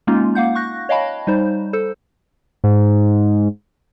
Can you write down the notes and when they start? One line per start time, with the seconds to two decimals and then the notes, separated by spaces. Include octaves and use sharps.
0.07 G#3 A#3 C#4 D#4 F4
0.35 A#3 F5 F#5 G6
0.55 C#6 F#6 A#6
0.89 C#5 D#5 F5 G5 A5 B5
1.27 G3 D#4 C5
1.73 A4 C5
2.64 G#2